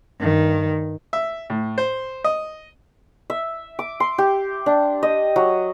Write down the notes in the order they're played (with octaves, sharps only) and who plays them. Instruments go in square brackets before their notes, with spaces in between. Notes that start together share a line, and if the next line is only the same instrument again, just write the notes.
[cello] G2 D#3
[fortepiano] E5
A2
C5
D#5
[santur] E5
D6
C6
G4
D4
D#5
F#3